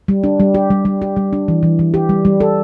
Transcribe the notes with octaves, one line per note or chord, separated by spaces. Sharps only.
G3
D4
G3
G4
G3
G3
G4
G3
D4
E3
E3
E3
G4
G3
G3
A4